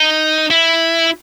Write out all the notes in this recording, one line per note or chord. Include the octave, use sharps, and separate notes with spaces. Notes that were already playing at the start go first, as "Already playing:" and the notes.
Already playing: D#4
E4